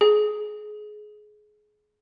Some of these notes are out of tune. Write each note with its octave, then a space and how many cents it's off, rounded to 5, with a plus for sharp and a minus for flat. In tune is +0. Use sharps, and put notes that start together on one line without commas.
G#4 +25